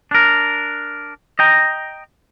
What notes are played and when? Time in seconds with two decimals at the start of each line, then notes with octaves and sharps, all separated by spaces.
0.11 D4 A#4
1.39 D#5 G5 A#5